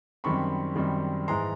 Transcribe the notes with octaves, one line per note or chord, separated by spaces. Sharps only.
F#2 D#3 G3 C4 B5 C#6
F#2 D#3 G3 C4
G#2 E3 G#3 A#5 C6